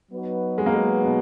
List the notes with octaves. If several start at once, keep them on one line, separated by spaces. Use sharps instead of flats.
F#3 B3 D#4 F#4 B4
G#3
A#3
G#3
B2